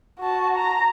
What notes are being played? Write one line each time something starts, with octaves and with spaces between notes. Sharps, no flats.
F#4 A5
A#5